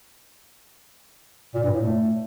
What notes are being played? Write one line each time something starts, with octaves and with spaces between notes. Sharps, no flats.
A#2
G2
A2
A3